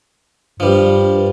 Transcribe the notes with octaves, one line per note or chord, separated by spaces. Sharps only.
G2 F3 G3